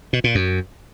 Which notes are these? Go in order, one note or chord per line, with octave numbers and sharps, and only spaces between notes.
B2
A#2
F#2